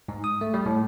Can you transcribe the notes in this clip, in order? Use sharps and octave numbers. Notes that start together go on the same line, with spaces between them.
G#2
D#6
A3
G3
A2